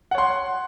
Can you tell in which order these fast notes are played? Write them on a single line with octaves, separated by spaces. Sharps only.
F#5 C#5 C6